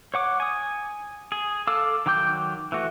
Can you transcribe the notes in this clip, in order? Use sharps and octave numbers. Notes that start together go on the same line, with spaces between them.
C#5 F#5 D6
G#5 D#6
G#4
A4 F5 D6 E6
D#3 F#3 G5 D6 G6
E3 A3 F#4